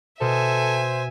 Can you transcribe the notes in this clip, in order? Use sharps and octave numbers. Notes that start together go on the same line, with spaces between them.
B2 A4 C5 E5 G#5